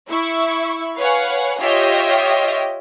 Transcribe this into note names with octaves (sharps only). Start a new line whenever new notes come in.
E4 E5 C#6
B4 C#5 F5 F#5 G#5
F4 G4 C#5 D#5 E5 G5